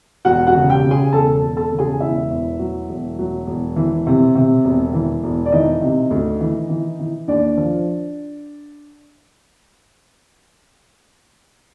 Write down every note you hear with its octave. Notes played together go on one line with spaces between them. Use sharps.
E1 F#4 F#5
F#4 F#5
C#3
G4 G5
C#3
G#4 G#5
E1 A4 A5
E1
A4 A5
C#3
G#4 G#5
E1 E4 E5
E2
F#3
E1
F#3
E1
E3
C3
C3
E1
E3
E1
D5
E3 D#4 D#5
C3
D2
E3
E3
E3
D#2 D4 D5
F3